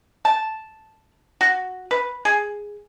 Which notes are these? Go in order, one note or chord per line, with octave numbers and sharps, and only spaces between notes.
A5
F#4
B4
G#4